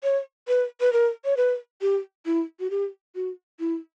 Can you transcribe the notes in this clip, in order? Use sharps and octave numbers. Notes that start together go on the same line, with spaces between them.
C#5
B4
B4
A#4
C#5
B4
G4
E4
F#4
G4
F#4
E4